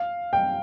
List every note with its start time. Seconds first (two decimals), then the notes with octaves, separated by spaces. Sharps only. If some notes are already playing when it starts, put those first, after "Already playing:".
Already playing: F5
0.33 G5